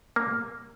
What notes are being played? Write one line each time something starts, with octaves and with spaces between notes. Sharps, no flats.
A#3